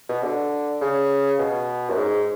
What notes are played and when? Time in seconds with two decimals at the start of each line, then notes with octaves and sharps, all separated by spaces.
0.09 B2
0.23 D3
0.81 C#3
1.39 B2
1.90 F#2
1.97 G#2